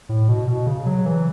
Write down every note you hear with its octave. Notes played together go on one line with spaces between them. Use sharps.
A2
B2
B2
C#3
F#3
E3